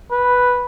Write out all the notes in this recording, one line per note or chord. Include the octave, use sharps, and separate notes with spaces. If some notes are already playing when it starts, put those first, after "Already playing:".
B4